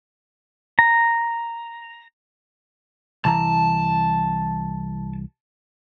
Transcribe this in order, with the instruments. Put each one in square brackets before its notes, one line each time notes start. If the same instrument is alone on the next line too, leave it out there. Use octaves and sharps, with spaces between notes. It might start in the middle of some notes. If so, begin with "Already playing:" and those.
[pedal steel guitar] A#5
[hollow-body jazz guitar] C2 E3 A#5 [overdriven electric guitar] A5